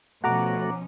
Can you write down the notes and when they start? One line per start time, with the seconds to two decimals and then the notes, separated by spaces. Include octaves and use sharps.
0.24 B2 F3 A3 C#4 F#4 F#5 A#5 D6